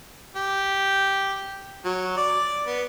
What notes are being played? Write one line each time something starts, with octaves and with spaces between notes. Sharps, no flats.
G4
F#3
D5
B3